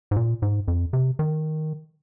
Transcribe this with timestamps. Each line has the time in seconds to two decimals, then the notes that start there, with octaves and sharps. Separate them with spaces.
0.11 G#2
0.16 A#2
0.42 G#2
0.68 F2
0.93 C3
1.19 D#3